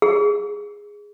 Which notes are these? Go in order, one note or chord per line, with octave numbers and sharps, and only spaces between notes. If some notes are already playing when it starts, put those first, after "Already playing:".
G#4